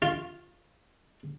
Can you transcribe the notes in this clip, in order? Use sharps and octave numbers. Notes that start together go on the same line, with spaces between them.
F4